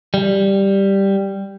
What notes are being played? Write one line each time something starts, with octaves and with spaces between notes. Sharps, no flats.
G3